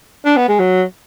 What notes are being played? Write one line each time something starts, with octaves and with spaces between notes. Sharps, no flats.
D4
B3
G#3
F#3